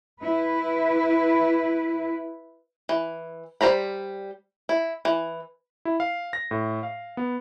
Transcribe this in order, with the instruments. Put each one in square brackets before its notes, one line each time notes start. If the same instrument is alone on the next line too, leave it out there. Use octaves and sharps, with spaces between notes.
[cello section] E4 B4
[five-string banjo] E3
G3 C5 A#5 B5
E4
E3
[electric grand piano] E4
F5
A#6
A2
F5
B3